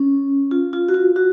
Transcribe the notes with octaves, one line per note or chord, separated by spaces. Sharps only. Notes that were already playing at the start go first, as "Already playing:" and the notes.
Already playing: C#4
F4
F4
F#4
F4
F#4